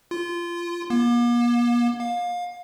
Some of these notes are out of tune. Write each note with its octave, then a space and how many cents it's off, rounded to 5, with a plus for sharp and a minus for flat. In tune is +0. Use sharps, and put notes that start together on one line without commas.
F4 -20
A#3 +45
F5 +25